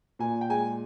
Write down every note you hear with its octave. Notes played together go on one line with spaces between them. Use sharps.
A#2 G#5
G5
G#3 G#5